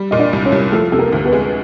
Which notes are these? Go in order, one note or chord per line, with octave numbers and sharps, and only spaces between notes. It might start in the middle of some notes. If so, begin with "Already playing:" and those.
Already playing: G3
A#2 D#5
D4 D5
C2
C#4 C#5
C2
F3 A3 A4
C3 A4
A#3 A#4
D2
B3 B4
G#3